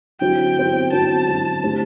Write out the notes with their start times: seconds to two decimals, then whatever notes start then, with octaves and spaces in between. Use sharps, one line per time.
0.20 D3 F#3 C4 E4 G5
0.56 D3 F#3 C4 E4
0.91 D3 F#3 C4 E4 A5
1.28 D3 F#3 C4 E4
1.63 D3 A3 E4 G4 C5